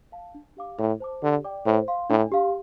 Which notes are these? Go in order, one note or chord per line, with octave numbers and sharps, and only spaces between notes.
F5 A5
D4
G4 F5 D6
A2 A4
C5 A5 D6
D3 G4
D5 G5 D6
A2 C5
F5 C6
A2 D4
G4 F5 C6